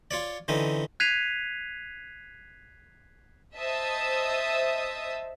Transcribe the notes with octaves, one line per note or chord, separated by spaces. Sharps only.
F4 C#5 D5
D3 E3 C4 C#4 D#4
F#6 G#6 B6 C7 D#7 F7
C5 D#5 E5 A5 D#6 E6